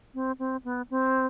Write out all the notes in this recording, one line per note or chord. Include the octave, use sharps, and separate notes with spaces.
C4
C4
B3
C4